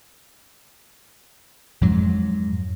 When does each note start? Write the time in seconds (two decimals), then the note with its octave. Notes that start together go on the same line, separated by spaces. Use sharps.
1.81 F2 G#2 F#3